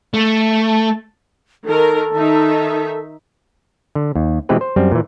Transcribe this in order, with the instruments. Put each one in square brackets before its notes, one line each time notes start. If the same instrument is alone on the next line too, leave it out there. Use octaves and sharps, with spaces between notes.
[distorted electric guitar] A3
[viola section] D#3 A#4 [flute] A4
[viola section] D#3 D#4 E5
[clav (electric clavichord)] D3
D#2
B2 E3 G#3 C4 G4 B4
C5
F#2 G3 C4
A#2 E3